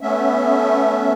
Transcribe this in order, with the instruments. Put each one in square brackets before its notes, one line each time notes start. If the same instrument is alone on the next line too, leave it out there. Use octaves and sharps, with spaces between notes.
[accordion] A3 B3 C#4 E5